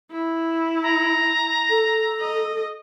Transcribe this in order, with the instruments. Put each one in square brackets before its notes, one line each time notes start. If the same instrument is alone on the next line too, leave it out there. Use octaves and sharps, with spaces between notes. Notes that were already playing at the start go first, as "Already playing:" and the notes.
[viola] E4
[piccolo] A#5
[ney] A4
[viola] D#5